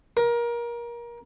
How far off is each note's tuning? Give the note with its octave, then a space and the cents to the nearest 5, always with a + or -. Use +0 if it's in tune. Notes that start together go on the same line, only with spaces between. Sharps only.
A#4 +25